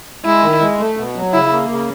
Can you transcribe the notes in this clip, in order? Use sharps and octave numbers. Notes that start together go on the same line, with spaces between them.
G#3 E4
D#3
G#3
A3
B2
F#3
C#3 E4
A#3
C#3